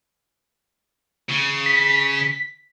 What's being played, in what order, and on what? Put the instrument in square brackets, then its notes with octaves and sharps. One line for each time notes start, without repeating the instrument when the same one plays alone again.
[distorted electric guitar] C#3
[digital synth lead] B6